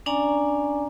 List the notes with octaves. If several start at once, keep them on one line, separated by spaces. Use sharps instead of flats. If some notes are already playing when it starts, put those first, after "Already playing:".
C#4 D4 D5 G#5 A#5